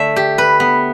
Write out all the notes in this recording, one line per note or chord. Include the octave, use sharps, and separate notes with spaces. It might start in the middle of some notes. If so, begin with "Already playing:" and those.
Already playing: D3 A3 E5
G4
B4
B3